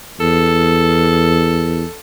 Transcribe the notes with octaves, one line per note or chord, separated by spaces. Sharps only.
E2 A4